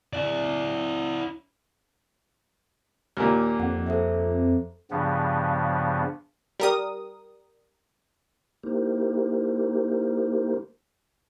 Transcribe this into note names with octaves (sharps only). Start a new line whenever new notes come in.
E4 D5
D#2 A#2 A#4 G#5 F6
F2 F#5
A4 C5 E5
G2 C#3 F3 B3
G3 A#4 D#6
A#3 D#4 E4 G4 A#4 C5